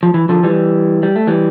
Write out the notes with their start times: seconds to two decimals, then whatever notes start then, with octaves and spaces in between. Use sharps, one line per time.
0.03 F3
0.14 E3
0.29 D3 F3
0.43 E3 G3
1.03 G3
1.16 A3
1.27 E3 G3